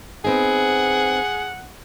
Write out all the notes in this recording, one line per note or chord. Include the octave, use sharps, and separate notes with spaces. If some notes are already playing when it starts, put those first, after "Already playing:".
B3 C4 D#4 G#4 F#5